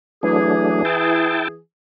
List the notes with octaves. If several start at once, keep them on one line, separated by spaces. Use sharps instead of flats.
E3 F#3 A3 D4 G#4
E4 G5 A5